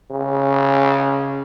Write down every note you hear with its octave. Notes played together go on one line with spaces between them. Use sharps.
C#3